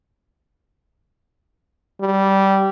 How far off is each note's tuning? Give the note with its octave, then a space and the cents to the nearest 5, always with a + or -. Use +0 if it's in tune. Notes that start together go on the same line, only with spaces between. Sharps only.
G3 -15